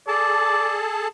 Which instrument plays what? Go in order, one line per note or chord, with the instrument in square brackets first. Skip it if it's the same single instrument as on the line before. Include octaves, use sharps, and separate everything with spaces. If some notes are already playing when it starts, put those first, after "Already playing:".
[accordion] G#4 A4 A5 [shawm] D5